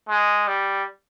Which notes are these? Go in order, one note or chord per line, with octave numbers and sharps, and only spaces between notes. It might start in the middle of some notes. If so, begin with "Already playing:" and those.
G#3
G3